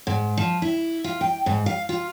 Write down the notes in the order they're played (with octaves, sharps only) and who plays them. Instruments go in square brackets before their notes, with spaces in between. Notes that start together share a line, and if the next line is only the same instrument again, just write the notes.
[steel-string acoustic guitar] G#2
F3
E4
F4
G5
G#2
F5
F4